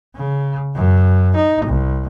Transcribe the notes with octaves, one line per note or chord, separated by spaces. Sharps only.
C#3
F#2
D#4
C2